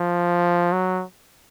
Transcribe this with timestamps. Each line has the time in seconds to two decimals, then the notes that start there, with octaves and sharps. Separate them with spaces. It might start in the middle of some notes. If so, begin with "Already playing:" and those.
Already playing: F3
0.73 F#3